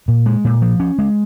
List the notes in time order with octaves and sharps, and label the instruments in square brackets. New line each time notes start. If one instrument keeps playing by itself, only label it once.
[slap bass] A#2
G#3
A#2
F3
C#4
G#3